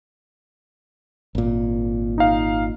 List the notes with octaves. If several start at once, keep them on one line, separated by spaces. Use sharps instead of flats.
G#1 A#2
D#4 F5